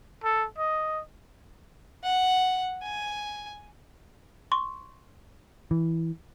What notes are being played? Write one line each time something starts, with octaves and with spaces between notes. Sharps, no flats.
A4
D#5
F#5
G#5
C6 C#6
E3